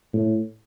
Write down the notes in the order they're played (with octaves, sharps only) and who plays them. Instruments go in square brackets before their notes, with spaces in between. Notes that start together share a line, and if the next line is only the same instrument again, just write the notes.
[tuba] A2